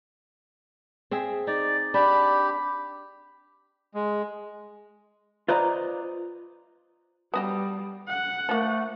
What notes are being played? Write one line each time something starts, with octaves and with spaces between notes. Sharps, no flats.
C4 G#4 E5
D#4 D5
D4 G4 B5
G#3
F4 B4 C5 D5 D#5 A#5
G3 B3 F#4 G4
F#5
F3 A3 A#3